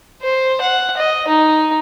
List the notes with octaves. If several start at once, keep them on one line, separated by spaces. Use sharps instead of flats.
C5
F#5
D#5
D#4